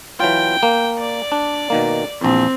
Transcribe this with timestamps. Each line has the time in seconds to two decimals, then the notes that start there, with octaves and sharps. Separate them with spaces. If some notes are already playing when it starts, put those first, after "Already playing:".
0.20 E3 F#3 F4 G5
0.63 A#3
0.99 D5
1.32 D4
1.70 B2 D#3 A#3
2.21 A#1 E2 C4